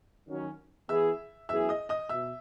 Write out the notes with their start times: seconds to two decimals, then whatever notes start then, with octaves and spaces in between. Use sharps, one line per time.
0.28 D#3 F#3 C#4
0.88 E3 B3 E4 G#4 E5 E6
1.49 F#2 E3 B3 E4 G#4 E5 E6
1.69 D#5 D#6
1.89 D#5 D#6
2.09 B2 E5 E6